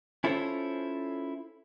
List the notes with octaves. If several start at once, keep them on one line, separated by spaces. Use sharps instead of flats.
C#4 E4 F4 A4 C5 C#5